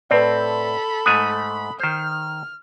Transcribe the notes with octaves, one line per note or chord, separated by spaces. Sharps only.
A2 C4 A4 B4 D5 B5
G#2 A3 G#5 D#6 F#6
D#3 C5 F6